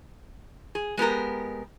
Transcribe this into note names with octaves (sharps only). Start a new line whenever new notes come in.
G#4
G#3 B3 G4 A#4